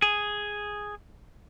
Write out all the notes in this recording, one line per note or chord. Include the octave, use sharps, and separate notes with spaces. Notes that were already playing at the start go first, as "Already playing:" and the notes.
G#4